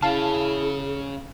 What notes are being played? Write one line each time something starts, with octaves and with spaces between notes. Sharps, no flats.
C#3 C#4 E4 G#4 F5 A5